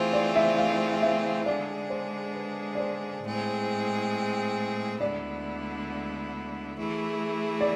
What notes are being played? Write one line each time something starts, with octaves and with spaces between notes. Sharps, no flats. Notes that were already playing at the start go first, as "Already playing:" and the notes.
Already playing: E3 A3 C4 F4 G#4 C5
D5
E5
F5
E5
D3 G#3 D4 G#4 D5
C5
B4
D5
C5
A2 G#3 C4 G#4
D2 D3 G#3 B3 E4 D5
E3 A3 E4 G#4
D5